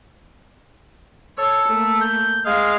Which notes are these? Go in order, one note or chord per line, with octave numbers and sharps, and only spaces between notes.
A4 C#5
A3 A#3
G6
G#3 G#4 F5